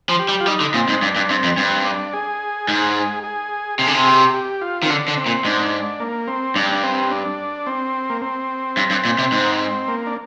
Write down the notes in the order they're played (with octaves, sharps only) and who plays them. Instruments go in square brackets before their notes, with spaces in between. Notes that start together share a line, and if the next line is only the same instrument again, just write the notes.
[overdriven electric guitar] F3
[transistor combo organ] G4
[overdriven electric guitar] G3
[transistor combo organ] F4
[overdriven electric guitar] G3 [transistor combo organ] D#4
[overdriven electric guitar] D3
[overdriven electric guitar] A#2 [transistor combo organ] C4
[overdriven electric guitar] G#2
[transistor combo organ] D#4
[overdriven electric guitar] G2 [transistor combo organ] D4
[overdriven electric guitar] G2
[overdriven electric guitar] G2 [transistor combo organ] C4
[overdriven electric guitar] F2
[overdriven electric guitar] G2 [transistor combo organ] C4
[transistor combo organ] D4
G#4
[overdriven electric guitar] G#2
[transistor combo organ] G#4
[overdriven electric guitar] C3 [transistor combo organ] G#4
[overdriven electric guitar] D3
C3
[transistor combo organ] G4
G4
F4
[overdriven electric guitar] D#3
[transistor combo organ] C4
[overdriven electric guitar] D3 [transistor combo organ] D4
[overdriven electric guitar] D3
[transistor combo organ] C4
[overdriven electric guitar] A#2
[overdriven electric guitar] G#2 [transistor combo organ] D4
[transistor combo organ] A#3
C4
[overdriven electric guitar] G2 [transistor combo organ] D4
[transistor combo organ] D4
C4
D4
C4
A#3
C4
[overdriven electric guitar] G2
G2
A#2
C3
G#2
[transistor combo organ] A#3
D4